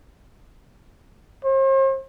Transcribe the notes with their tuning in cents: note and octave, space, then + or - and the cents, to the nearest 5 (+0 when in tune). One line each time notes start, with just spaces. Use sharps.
C5 +45